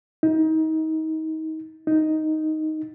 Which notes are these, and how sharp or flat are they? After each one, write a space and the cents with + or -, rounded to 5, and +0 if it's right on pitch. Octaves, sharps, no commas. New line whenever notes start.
D#4 +30
D#4 +5